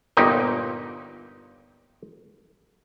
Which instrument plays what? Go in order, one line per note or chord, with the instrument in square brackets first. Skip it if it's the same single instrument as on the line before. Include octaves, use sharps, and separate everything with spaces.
[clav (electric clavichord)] G1 A#2 D#4 G4